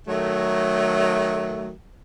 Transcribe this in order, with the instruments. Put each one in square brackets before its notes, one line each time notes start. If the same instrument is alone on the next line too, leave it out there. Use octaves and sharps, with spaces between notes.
[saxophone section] D#3 F#3 A3